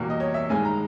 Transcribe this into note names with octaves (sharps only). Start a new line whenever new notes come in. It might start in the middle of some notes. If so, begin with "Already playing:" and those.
Already playing: E2 B2 G3 A#3
D#5
C#5
E5
G2 D#3 G#3 G#5
A#5